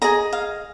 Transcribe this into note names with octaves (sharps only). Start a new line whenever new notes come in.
G#4 D#5 A#5
F5